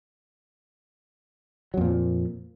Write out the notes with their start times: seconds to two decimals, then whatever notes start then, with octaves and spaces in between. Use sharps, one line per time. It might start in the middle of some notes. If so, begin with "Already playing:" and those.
1.74 F#3
1.77 F2
1.81 A#2
1.85 F3